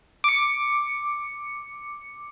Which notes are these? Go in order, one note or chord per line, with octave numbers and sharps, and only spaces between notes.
D6 C#7